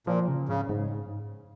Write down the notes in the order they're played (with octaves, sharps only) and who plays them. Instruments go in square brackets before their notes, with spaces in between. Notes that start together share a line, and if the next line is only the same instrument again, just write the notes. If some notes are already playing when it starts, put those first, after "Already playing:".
[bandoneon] A#2 [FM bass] F3
[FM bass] C#3
[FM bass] G#2 [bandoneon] C#3
[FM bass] G#2